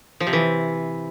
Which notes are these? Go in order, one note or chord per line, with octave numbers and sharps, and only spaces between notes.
F3
C3
E3